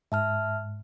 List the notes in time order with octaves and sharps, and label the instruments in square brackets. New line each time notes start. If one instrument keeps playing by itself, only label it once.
[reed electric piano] G#2 [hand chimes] E5 A5 F6